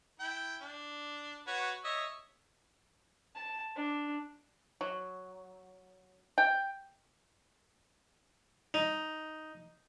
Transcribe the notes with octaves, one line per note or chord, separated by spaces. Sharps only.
E4 G5
D4
F#4 B4 C#5
C#5 D#5 E5
A5
D4
F#3
G5
D#4